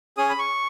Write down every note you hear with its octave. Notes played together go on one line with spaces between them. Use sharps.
C#4 G#4 D#6
B5
C#6